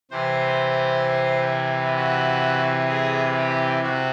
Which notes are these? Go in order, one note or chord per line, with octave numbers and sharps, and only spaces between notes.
C3 E3 C5
F#4
G#4
G4
C3 F#4